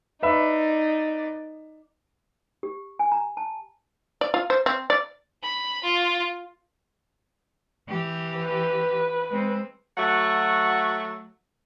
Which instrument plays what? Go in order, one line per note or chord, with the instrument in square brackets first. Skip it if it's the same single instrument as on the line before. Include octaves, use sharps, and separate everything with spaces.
[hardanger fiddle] D#4 D5 [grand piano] B4 E5 B5
[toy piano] G4
G#5
A#5
A5
[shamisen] D5
F4
C5
C4
D5
[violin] B5
F4
[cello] E3 G4
[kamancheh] B4
[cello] G#3 C4
[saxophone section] F#3 A3 F#4 F#5